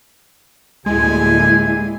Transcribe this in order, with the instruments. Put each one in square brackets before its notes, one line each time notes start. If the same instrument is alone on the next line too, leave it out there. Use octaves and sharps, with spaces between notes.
[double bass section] D2 A2 A#3 [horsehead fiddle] G3 E4 [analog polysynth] G#3 [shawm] G#5